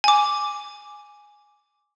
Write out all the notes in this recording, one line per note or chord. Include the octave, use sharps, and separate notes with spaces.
G#5 D6